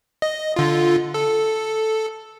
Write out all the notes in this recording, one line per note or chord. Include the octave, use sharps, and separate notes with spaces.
D#5
D3 F4
A4